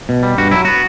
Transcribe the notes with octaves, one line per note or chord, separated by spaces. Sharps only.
B2
G3
G2 F#4
F#3 E4
B3 F#4